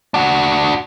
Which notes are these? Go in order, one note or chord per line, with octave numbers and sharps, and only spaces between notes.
D4 F#4